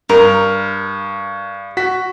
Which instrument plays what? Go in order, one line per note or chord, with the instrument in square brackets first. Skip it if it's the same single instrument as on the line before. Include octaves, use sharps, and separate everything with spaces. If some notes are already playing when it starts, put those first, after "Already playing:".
[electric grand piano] G2 [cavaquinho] A#4
[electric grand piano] F#4 B6